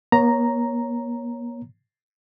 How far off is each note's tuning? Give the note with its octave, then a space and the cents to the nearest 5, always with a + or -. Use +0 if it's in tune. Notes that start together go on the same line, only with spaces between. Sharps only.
A#3 +45 C#5 +0 A#5 +0